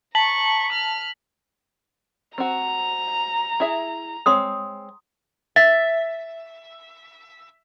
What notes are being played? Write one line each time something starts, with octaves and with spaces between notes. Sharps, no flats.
A5 A#5 C#6 B6 F#7
F6
C4 F#4 A#5
E4 G#4 E5
G#3 C4 C#5 C6 D#6
E5 A6